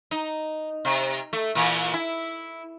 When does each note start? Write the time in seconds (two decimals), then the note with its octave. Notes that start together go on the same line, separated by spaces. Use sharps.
0.11 D#4
0.85 C3
1.33 A3
1.55 A#2 E3
1.94 E4